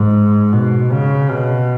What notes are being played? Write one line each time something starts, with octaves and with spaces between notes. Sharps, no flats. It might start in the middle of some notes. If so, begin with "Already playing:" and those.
Already playing: G#2
B2
C#3
B2